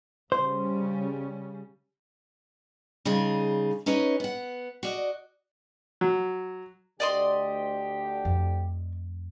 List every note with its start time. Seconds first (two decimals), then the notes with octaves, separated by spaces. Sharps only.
0.32 C#3 G3 C#4 C5
3.05 C#3 G3 D#4 F4 G#4
3.86 C#4 D#4 B4 C#5 D#5
4.20 B3 F#5
4.83 F#4 D5 D#5
6.01 F#3
7.00 D2 D3 G4 D5 D#5 C6
8.25 F2 A3